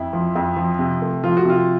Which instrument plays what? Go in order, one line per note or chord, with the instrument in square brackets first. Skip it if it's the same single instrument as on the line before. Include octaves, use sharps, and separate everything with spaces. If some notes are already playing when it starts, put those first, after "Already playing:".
Already playing: [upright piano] F2 E4
F3
F2
F3
C3
A3
F3 F4
F#4
C3 F4